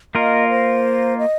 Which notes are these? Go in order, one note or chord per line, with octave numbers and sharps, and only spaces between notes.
A#3 F4 A#4 D#5
C5
D#5